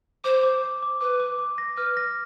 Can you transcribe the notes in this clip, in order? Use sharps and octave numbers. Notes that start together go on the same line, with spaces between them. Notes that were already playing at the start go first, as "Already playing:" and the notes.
C5 D6
D6
D6
D6
B4 D6
D6
D6
A#6
B4 F6
A#6